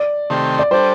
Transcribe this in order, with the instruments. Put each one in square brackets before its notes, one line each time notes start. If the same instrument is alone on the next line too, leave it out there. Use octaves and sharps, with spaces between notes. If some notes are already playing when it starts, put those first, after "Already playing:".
Already playing: [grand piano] D5
[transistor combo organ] C3 D#3 A3 C4 G4
[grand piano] D5
[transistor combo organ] G3 D4 A4 [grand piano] C5